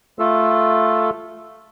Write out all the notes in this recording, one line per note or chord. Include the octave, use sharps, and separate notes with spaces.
A3 F4 A4